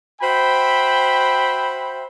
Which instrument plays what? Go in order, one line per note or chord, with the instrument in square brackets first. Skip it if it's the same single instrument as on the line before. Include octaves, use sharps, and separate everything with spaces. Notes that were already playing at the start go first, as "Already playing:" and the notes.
[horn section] F#4 C5 E5 G5 B5